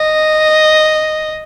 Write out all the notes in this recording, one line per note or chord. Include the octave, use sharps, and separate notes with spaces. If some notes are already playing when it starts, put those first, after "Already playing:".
Already playing: D#5